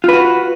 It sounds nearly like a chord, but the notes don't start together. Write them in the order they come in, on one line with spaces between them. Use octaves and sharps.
F4 B4 F#4